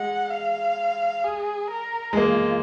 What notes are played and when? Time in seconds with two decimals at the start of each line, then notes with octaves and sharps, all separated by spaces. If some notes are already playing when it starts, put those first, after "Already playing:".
Already playing: G#3 F#5
0.30 F5
1.24 G#4
1.70 A#4
2.13 G#3
2.17 A#3 F4